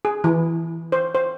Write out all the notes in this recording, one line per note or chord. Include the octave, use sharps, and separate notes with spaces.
G#4
E3
C5
C5